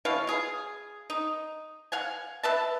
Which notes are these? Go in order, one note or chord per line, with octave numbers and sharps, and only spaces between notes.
B2 E3 C#5 F5
F4 G#4
D#4
F5 F#5 G#5
B4 E5 A5